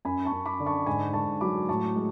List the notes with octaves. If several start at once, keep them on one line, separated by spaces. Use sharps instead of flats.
F#2 G#5 B5
A5 C#6
F#2
B5 D6
D3
A5 C#6
G#2 G#5 B5
G#2 A5 C#6
F#3 B5 D6
A2 A5 C#6
G#3